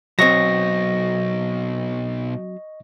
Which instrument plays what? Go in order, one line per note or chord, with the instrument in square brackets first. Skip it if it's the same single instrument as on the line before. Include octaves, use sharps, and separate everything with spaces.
[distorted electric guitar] B1 [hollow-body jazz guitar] F#3 C4 [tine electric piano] D#5 C#6 A#6